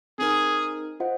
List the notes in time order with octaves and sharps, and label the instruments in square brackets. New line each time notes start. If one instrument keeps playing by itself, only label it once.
[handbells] C4 D#4 A#4 [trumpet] G#4
[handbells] F4 C5 D#5 F#5